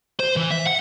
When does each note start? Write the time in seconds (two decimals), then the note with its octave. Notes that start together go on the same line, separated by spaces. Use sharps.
0.20 C5
0.37 E3
0.52 E5
0.67 F#5